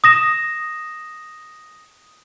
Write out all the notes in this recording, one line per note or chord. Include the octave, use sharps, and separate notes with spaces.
D#6 A#6 E7